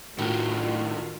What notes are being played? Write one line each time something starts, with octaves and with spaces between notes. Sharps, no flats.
A2 D#3 A3 D4 F4 F#4 A#4